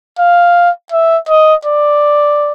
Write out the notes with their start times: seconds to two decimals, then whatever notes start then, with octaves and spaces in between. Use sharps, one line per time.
0.19 F5
0.92 E5
1.29 D#5
1.65 D5